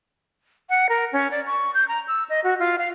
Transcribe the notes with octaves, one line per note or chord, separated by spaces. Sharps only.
F#5
A#4
C#4
D5
C#6
G6
A#5
E6
D#5
F#4
F4
F5